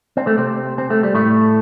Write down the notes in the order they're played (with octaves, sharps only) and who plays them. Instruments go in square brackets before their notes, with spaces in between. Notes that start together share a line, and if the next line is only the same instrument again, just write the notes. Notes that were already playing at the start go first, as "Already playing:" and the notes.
[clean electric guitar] C4
A3
C3 C4
C4
A3
G3
A2 A3